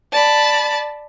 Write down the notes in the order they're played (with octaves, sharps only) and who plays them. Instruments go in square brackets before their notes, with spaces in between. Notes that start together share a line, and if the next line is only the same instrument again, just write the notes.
[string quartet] D5 A5 B5